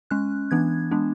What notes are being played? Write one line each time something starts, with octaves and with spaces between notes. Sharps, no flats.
G#3 C#4 F#6
E3 B3 D4 G#6
G#3 B3 D4